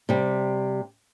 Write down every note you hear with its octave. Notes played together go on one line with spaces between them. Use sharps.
C3 G3